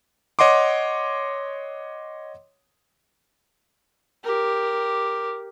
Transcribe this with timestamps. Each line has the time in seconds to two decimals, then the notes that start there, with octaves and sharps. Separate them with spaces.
0.39 C#5 D#5 F#5 C6 D6
4.24 G4 A#4